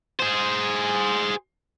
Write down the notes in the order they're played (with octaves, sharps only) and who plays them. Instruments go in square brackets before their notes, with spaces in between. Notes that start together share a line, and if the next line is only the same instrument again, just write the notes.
[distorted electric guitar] G#4 C5